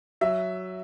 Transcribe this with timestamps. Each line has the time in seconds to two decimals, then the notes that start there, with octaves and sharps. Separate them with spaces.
0.21 F#3 E5